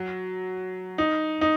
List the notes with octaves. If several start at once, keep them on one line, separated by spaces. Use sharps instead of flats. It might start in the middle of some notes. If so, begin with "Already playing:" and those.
Already playing: F#3
D#4
D#4